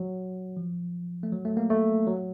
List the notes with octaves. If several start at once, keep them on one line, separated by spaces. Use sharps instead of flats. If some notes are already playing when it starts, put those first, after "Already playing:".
Already playing: F#3
F3
A3
F#3
A3
A#3
A3
F#3